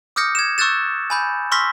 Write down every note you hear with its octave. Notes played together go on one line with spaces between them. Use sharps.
D6 D#6 F6 G6 A#6 C#7
G#6 E7
C#6 E6 F#6 G6 A6 E7
G#5 B5 G6
C6 C#6 E6 F6 A#6 B6